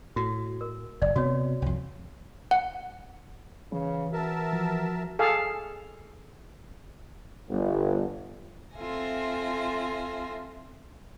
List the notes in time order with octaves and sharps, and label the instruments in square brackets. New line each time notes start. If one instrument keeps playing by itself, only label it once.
[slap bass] A2 [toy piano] F#4
[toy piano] A#4
[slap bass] F#1 [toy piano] D5
[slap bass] C3 B3 [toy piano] F#4 C#5
[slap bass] C2 F2
[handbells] F#5
[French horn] C#3 [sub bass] E3
[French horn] F#4 [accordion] A#4 E5 A5
[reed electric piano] F3
[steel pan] G#4 A4 F5
[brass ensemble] G1
[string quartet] C4 F4 A4 E5 G#5 A#6